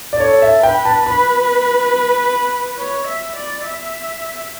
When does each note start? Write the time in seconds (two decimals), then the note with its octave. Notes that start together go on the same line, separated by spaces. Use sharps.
0.13 D5
0.20 A4 C#5
0.42 E5
0.63 B4 G5
0.85 A5
1.06 B4 B5
2.79 C#5
3.07 E5
3.36 D5
3.65 E5